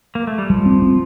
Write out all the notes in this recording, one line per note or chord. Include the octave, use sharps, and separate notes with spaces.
A#3
A3
G3
F3 G3
C4
C4